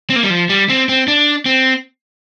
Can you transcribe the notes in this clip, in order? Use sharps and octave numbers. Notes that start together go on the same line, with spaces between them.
C4
A#3
G3
F3
G3
C4
C4
D4
C4